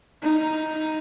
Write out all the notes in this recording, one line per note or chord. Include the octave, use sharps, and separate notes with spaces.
D#4